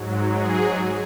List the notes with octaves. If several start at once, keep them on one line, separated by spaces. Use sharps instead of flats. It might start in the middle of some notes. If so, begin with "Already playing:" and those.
Already playing: G#2 F#3
G#4